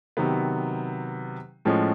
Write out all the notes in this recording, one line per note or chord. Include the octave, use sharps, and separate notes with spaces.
C3 D#3 F#3 B3
A2 F3 G#3 C#4